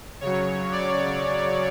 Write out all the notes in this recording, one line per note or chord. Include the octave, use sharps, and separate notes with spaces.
C#3 F#3 C#5
D5